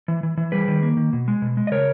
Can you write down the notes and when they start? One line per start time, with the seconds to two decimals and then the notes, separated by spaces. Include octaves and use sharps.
0.08 E3
0.23 E3
0.37 E3
0.52 G3 G#4 B4
0.68 D#3
0.83 A#3
0.97 D#3
1.13 B2
1.28 G#3
1.42 B2
1.57 G#3
1.67 D#5
1.71 C#3 A#4 C#5